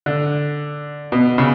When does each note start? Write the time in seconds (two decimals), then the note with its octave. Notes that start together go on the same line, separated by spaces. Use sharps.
0.06 D3
1.12 B2
1.38 C#3